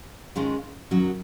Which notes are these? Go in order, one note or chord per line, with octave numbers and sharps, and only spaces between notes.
G#2 D#3 G#3 C#4 F4
F#2 D#3 F#3 C#4 F#4